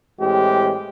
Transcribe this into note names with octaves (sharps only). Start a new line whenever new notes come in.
A2 E3 G#3 C4 G4